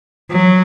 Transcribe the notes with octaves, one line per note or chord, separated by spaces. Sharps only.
F#3